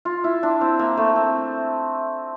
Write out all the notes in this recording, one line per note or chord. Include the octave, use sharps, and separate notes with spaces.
F4
E4
D4
C4
A#3
A3
C4